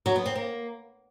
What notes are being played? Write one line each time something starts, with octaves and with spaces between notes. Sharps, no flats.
F#3
B3
C4
A#3